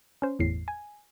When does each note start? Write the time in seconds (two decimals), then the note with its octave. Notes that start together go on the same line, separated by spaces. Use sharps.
0.22 C#4 C5
0.39 G1 E2 A2 C7
0.68 G#5